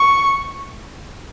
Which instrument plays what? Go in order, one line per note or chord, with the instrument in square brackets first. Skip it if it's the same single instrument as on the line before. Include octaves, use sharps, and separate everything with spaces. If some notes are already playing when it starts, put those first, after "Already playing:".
Already playing: [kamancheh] C#6